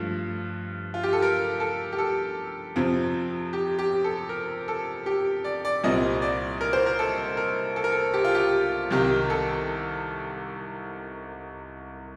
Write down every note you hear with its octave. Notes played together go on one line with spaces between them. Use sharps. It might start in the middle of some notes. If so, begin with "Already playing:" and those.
Already playing: G2 F3 A3
F4
G4
A4
A#4
A4
G4
A4
F2 C3 F3 C4
G4
G4
A4
A#4
A4
G4
D5
D5
C2 A#2 G3 C4 D#5
D5
A#4
C5
A#4
A4
A#4
A4
A#4
A4
G4
F4
G4
C2 C3 D#3 G4
A4